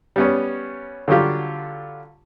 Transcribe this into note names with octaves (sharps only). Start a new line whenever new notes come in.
G3 B3 C#4
D3 F#3 G3 F4 G4